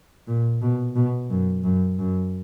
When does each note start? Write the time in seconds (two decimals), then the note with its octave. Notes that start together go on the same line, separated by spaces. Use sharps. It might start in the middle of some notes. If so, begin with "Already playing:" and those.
0.28 A#2
0.62 B2
0.96 B2
1.30 F#2
1.64 F#2
1.99 F#2